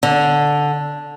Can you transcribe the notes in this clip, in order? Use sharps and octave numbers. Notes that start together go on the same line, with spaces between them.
D3